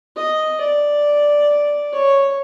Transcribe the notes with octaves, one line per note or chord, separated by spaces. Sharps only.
D#5
D5
C#5